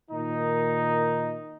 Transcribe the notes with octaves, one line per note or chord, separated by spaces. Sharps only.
A#2 D#3 D#4